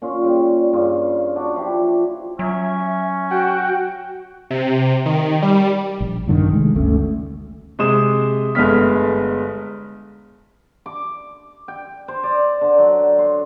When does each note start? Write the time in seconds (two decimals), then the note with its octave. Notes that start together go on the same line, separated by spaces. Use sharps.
0.02 A#2 C#4 F4
0.21 C#3 G3
0.73 G2 C#3 F4
1.36 D4 F4 F#4
1.56 F3 E4 G4
2.39 F#3 C#4 E5
3.31 F#4 F#5 G5
4.50 C3
5.06 D#3
5.42 G3
6.00 A#1
6.27 E2 G2 D3 D#3
6.52 C3 D#3 G#3 A3
6.75 G1 D2 A3 C#4
7.79 C3 G#3 D#6 E7
8.55 G1 G#3 A3 B3 F6 B6
10.86 D6
11.68 G5
12.08 C5
12.23 D5
12.61 D3
12.78 F#3
13.19 C6